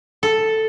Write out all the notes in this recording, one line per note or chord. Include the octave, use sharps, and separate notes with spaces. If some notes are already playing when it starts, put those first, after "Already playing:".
A4